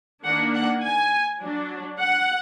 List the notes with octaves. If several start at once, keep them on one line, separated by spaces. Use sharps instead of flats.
D#3 A#3 D4 F#5
F#5
G#5
F#3 D4
F#5